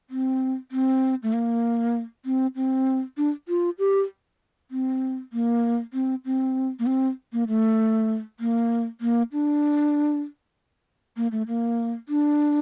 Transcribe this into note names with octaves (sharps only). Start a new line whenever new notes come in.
C4
C4
A3
A#3
C4
C4
D4
F4
G4
C4
A#3
C4
C4
A#3
C4
A#3
A3
A#3
A#3
D4
A#3
A3
A#3
D4